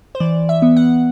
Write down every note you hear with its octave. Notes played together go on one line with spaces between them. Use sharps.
C5
E3 D5
E5
B3
F#5